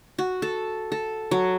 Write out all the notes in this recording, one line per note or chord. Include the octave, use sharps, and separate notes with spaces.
F#4
A4
A4
F#3